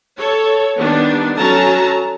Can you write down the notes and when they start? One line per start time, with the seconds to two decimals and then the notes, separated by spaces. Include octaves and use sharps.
0.18 A4 C#5
0.77 D#3 G3 B3 D4
1.37 F#3 C#4 A4 A5 A#5